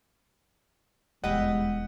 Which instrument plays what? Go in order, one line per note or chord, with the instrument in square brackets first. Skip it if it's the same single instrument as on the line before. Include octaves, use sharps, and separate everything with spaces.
[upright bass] D#1 E2 [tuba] G#3 [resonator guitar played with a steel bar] E4 G4 D#5 [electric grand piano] F#5